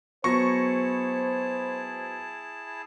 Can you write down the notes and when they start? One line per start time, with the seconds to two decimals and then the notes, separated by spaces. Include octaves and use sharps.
0.24 F#3 B3 E4 G#4 C5 A5 C#6 A#6